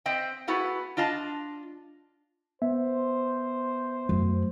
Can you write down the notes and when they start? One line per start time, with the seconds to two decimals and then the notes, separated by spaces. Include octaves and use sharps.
0.06 C4 D#5 E5 G5
0.48 A3 B3 E4 F#4 G#4
0.97 D4 F4 D#5 A5
2.62 B3 C5 E5
4.09 F#2 A3